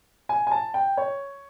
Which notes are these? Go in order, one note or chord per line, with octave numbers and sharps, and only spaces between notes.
G#5
G#5
A5
G5
C#5